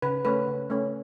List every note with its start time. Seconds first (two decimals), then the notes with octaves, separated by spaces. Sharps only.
0.02 C#3 B4
0.25 A3 C#4 B4
0.47 C#3
0.70 A3 C#4